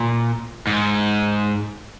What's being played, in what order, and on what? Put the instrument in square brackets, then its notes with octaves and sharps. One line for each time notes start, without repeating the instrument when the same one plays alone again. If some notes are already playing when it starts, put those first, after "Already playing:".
Already playing: [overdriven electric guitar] A#2
G#2